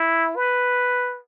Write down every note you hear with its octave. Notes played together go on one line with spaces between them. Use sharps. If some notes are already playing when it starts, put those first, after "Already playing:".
Already playing: E4
B4